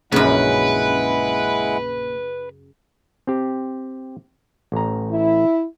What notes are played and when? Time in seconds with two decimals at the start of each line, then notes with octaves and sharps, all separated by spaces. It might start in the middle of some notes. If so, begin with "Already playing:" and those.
0.12 A#1 F#2 C#3 G#3 C#4 E4 B4 F#5
3.27 C4 G4
4.72 A1 A#5
5.10 E4